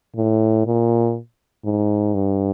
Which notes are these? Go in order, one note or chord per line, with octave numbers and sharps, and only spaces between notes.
A2
A#2
G#2
G2